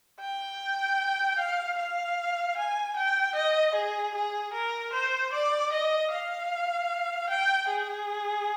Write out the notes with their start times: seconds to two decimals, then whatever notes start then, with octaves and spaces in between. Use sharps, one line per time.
0.20 G5
1.38 F5
1.78 F5
2.57 G#5
2.96 G5
3.35 D#5
3.75 G#4
4.14 G#4
4.53 A#4
4.93 C5
5.32 D5
5.72 D#5
6.11 F5
7.29 G5
7.69 G#4